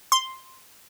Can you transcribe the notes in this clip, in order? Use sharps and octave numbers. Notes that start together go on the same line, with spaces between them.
C6